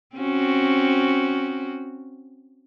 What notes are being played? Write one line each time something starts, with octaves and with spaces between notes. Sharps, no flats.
C4 C#4 F#4